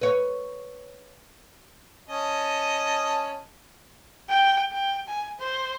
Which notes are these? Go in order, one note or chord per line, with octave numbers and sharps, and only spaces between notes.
B4 C#5
C#4 D#5 A5
G5
G5
G#5
C5